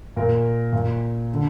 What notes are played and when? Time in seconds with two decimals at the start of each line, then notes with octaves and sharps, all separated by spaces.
0.16 A#2 A#4
0.73 A#2
1.33 D3